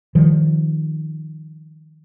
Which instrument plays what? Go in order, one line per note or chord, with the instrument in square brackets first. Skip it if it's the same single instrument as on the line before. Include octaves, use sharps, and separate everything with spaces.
[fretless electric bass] D#3 F3 G3